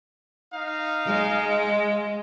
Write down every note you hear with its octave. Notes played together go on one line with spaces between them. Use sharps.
D#4 F5
G#3